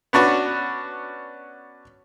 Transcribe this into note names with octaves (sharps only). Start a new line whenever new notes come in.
B3 C#4 D4 F#4